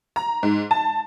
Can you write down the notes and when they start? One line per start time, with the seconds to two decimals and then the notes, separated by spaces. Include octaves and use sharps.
0.16 A#5
0.43 G#2
0.71 A5